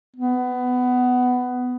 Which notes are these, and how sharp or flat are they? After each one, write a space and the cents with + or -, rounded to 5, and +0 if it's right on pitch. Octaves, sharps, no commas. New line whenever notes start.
B3 +15